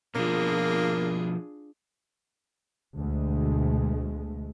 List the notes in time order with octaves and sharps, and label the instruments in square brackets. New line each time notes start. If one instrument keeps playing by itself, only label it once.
[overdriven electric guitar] B2 F3 [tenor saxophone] A#3 [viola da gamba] D4 F4 G#4
[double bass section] D2 B2 G#3 A3